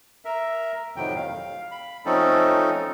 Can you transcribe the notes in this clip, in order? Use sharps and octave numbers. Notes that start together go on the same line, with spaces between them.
A#4 E5
F2 A2 C3 D#3 F#3 G5
F5
B5
F3 A3 C4 C#4 D#4 A4